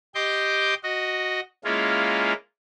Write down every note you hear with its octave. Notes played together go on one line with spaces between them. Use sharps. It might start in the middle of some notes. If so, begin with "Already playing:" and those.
G4 D#5 C6 D6 G6
F#4 D#5
G#3 A#3 C#4 E4 F4